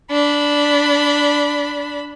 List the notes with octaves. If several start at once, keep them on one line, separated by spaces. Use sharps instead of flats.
D4 B5